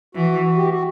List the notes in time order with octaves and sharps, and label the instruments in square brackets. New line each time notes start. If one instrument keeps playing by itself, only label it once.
[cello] E3 [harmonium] F#4
[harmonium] G4
F#4